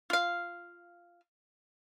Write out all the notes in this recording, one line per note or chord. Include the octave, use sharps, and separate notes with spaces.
F4 F5